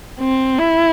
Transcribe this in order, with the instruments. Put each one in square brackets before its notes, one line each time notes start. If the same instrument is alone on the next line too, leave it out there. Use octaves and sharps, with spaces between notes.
[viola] C4
E4